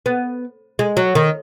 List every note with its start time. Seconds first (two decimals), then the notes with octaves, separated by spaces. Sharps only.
0.06 B3
0.79 G#3
0.97 F#3
1.15 D#3